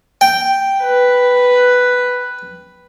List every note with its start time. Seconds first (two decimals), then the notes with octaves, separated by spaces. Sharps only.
0.21 G5
0.83 B4